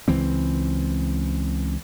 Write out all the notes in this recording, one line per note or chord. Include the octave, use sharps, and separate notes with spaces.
C#2 E3 C4